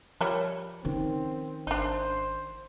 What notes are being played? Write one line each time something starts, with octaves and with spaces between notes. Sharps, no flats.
F3 G3 A#4 C#5
D#3 C4 C#4
G#1 D4 D#4 C5